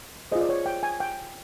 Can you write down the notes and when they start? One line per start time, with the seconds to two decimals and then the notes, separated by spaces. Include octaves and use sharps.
0.32 F4 G#4 C5 D#5
0.41 D5
0.49 C#5
0.66 G5
0.83 G#5
1.00 G5